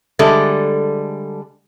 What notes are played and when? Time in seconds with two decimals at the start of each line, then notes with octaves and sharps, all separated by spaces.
0.19 D3 G3 G#3 A4 D5 E5